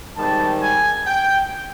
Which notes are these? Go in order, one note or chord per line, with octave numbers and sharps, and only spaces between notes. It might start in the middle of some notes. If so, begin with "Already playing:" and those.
G#2 D#3 G3 C4 A5
G#5
G5